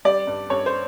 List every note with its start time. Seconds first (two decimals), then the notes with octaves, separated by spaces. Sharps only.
0.05 G3 D5
0.27 G2
0.50 G2 C#5
0.66 C5